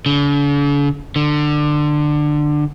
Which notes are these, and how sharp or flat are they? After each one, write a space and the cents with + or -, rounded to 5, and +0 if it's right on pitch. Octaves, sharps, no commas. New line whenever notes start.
D3 -45
D3 +20